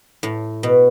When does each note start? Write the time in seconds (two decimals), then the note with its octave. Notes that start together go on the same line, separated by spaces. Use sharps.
0.23 A2
0.63 B2